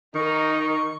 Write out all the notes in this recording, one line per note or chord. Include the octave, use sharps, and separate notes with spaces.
D#3 D#4 A#4 C#6